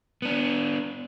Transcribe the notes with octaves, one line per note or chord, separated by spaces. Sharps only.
B3 D4